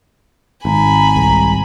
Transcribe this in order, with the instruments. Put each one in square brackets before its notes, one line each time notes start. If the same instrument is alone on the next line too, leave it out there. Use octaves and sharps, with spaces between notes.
[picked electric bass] G#1 [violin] G#5 B5 [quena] A#5
[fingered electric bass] C2